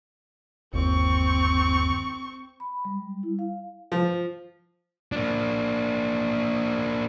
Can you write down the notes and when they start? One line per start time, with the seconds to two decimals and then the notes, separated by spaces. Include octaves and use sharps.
0.73 G1 D#2 C4 C#6
2.60 B5
2.85 G3
3.23 E4
3.39 F5
3.92 F3
5.12 A#3 D4